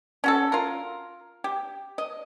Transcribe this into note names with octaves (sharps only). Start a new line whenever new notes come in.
C#4 F#4 A4
F4 A#4
G4
D#5